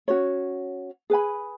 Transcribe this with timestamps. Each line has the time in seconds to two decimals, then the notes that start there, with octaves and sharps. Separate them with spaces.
0.08 C#4 F#4 C#5
1.10 G#4 B4 G#5 B5